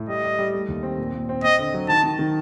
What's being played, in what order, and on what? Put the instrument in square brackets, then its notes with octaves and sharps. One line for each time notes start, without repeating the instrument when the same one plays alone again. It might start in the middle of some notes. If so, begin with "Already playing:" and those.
Already playing: [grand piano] A2
[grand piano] G3 [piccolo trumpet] D#5
[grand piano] G3
G3
A3
D#2
C4
A#2
A#2
C4
[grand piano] C4 [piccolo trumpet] D#5
[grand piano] D3
F#3
[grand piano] D#3 [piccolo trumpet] A5
[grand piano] D#3
D#3